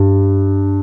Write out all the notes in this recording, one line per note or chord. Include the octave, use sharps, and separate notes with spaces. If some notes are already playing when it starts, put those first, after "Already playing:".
Already playing: G2